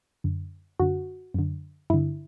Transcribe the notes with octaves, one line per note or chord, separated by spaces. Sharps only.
F#2 D3
F#2 D3 F#4
F#2 D3
G2 D3 E4